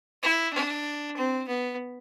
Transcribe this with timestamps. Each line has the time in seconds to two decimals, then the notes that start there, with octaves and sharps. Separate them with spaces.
0.23 E4
0.53 D4
1.17 C4
1.48 B3